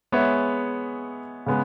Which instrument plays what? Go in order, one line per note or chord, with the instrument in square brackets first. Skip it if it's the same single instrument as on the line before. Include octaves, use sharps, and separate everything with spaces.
[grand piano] G#3 B3 G#4 C#5 E5
C#3 G#3 B3